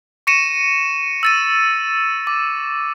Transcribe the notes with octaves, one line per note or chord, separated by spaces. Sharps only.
C#6 A#6 C#7 D#7 E7
E6 A6 D#7
D6